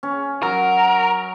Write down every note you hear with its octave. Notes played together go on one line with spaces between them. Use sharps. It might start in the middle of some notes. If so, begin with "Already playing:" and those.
C#4
F#3 A#4